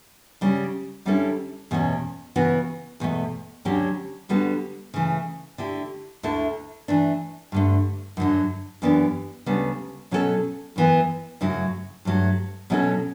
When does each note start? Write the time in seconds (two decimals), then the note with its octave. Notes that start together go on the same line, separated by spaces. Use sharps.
0.41 C#3 G3 C#4
1.05 D3 G3 C#4 E4 A4
1.71 E2 B2 A3 C#4
2.36 C#3 E3 B3 F#4
3.00 E2 B2 A3
3.65 D2 D3 F#3 C#4 G4
4.29 D3 G3 B3 F#4 A4
4.94 C#3 E3 A3
5.58 D3 A3 E4 G4
6.23 D2 D3 A3 E4 A4
6.88 E3 A3 D4
7.52 G2 D3 A3
8.17 F#2 D3 F#3
8.82 F#2 E3 B3 D4 G4
9.46 D2 C#3 G3 B3
10.11 B2 F#3 C#4 E4 A4
10.76 F#2 E3 B3
11.41 F#2 C#3 F#3 A3 E4
12.05 G2 F#3 A3
12.70 B2 F#3 C#4 E4 A4